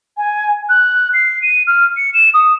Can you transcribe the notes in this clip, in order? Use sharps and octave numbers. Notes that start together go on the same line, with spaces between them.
G#5
F#6
C7
D#7
F6
C#7
E7
D#6